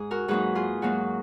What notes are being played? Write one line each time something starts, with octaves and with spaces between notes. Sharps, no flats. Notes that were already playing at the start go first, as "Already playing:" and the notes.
Already playing: G#2 G#4
F#4 A#4
G#2 F#3 A#3 D#4 G#4 B4
F4 G#4
G#2 F#3 A#3 D#4 F#4